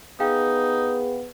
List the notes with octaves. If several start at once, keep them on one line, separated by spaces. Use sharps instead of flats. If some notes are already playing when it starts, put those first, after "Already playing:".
B3 D#4 G#4 F5 G5